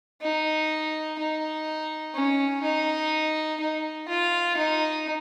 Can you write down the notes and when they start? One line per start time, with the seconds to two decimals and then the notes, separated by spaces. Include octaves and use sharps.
0.21 D#4
1.18 D#4
2.15 C#4
2.63 D#4
3.60 D#4
4.08 F4
4.57 D#4